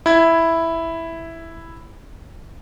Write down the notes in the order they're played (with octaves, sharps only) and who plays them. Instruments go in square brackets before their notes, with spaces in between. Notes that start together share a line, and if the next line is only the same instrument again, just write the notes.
[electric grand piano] E4 G#6